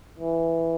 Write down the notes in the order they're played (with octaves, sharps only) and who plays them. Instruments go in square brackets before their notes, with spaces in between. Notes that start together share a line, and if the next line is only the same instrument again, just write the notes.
[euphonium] E3